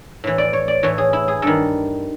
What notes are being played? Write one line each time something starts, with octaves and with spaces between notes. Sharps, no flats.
A2 E3
D5
C#5
D5
A2 E3 C#5
G#4
E4
G#4
G2 D#3 A4